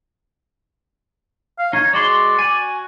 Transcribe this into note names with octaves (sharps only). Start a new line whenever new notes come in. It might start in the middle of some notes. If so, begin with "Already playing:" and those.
F5
D#4 C#5
G#3 F#4 D5 C6
F#4 G#5